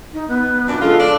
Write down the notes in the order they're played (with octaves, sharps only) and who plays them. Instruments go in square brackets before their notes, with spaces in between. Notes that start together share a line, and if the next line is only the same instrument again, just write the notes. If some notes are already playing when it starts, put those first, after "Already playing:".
[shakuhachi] D#4
B3
[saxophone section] F#2 A#2 D4
[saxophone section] D3 G#3 F4 [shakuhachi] A4
[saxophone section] D4 D5